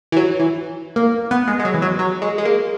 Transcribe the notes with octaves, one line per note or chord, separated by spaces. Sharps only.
E3
F#3
E3
A#3
B3
G#3
G#3
F#3
E3
F#3
F#3
G#3
G#3
A#3